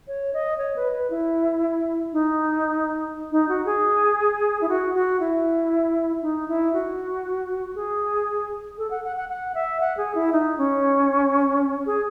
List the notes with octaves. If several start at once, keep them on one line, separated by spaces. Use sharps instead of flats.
C#5
D#5
C#5
B4
B4
E4
D#4
D#4
F#4
G#4
E4
F#4
F#4
E4
D#4
E4
F#4
G#4
A4
F#5
F#5
F#5
F#5
E5
F#5
G#4
E4
D#4
C#4
G#4